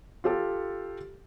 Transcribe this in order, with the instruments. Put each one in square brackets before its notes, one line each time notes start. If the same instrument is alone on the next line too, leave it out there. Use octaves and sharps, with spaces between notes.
[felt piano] F4 G4 A4